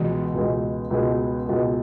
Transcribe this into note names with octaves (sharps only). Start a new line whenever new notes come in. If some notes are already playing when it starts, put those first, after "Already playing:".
Already playing: C#2 B2 E3 G#3
C#2 B2 G#3
C#2 B2 G#3
C#2 B2 G#3